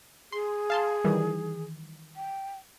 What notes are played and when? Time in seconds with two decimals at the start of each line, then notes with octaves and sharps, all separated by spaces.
0.32 G#4 C6
0.70 F5 A5 C6
1.05 D#3 E3 G3
2.16 G5